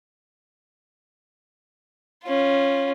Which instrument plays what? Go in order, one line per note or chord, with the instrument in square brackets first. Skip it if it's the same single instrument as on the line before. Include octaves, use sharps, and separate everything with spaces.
[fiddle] C#4 F4